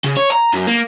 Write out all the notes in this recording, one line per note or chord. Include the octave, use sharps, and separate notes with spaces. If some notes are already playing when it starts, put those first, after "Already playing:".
C#3
C#5
A#5
F#2
A#3